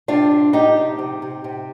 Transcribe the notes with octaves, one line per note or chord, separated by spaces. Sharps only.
C3 D4 F4
C3
F3 D#4 G4
C3
C3
C3
C3